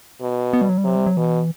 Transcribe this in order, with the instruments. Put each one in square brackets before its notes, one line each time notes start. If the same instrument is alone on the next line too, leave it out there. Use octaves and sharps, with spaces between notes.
[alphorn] B2
[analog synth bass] B3
G3
F#3
G3
[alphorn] C3 [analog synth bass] F#3
[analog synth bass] G3
F#3
[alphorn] B2 [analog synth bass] E3